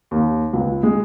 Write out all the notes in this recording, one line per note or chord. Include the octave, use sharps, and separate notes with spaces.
D#2
C#2
G#3